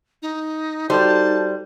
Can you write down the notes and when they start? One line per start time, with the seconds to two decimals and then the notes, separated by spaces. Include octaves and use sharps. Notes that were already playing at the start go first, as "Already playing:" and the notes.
0.22 D#4
0.90 G3 D#4 F#4 A4 C5 A5 G6